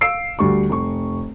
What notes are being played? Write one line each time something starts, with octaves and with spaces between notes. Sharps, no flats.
F5 E6 C7 D7
D2 G3 C#6
F1 C#6